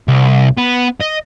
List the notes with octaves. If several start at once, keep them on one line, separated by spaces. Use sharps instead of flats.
C2
B3
D#5